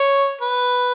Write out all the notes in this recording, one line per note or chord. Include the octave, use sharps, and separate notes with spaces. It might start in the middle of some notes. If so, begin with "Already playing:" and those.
Already playing: C#5
B4